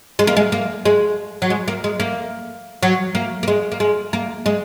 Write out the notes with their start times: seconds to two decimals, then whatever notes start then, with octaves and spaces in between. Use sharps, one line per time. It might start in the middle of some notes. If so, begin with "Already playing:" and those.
0.19 G#3
0.27 A#3
0.37 G#3
0.52 A#3
0.85 G#3
1.42 F#3
1.50 G#3
1.68 A#3
1.84 G#3
2.00 A#3
2.83 F#3
3.15 A#3
3.43 A#3
3.48 G#3
3.72 A#3
3.80 G#3
4.13 A#3
4.46 G#3